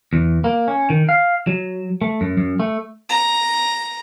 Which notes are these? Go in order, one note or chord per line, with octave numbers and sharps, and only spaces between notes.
E2
A#3
C#4
D#3
F5
F#3
A3
F#2
F#2
A3
A#5